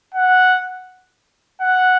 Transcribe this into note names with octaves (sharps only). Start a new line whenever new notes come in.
F#5
F#5